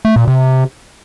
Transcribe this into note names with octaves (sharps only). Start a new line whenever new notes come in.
A3
A#2
C3